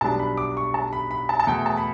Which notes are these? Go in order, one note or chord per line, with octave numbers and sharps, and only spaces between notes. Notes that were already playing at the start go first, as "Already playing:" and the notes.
B1 B2 G3 D4 A5
B5
D6
C#6
A5
B5
B5
A5
A5
E2 B2 A3 G5
A5
B5